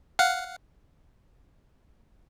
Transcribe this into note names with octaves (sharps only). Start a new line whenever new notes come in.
F5 F#5